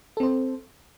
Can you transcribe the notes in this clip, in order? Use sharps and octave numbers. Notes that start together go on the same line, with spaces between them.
C4 A4 C5